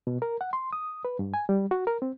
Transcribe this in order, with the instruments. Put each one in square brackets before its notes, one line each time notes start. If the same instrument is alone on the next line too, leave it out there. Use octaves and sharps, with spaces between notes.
[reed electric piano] B2
A#4
F#5
C6
D#6
B4
G2
G#5
G3
F#4
A#4
C4